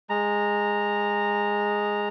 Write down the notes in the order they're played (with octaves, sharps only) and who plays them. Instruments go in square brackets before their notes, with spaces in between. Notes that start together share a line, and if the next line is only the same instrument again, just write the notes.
[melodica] G#3 A#5